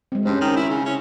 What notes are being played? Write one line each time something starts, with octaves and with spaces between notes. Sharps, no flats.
G#3 C4
G2 C#4 C5
D#3
E4
C#3
C#4